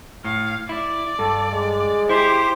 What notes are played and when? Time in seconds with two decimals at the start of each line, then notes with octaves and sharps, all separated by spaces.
0.24 A2 F5
0.69 E4 D5
1.19 G2 A4
1.52 G#3
2.09 E4 G4 C5